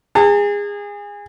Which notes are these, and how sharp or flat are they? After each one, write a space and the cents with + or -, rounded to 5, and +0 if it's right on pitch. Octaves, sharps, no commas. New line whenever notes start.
G#4 -25 A5 +45